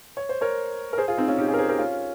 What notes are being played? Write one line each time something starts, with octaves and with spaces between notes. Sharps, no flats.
C#5
C5
A#4 C#5
A#4
G#4 C5
F4 G#4
C4 D#4
C#4 F4
D#4 G4
F4 G#4
A#4
G#4 C5
G4 A#4
C#4 F4